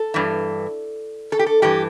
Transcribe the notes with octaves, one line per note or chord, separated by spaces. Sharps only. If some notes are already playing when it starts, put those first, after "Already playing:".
Already playing: A4
G2 E3
A4
G4
A4
G2 E3 G4